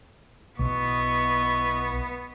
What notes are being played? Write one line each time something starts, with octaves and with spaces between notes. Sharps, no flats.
B1 B3 E4 D#5 C#6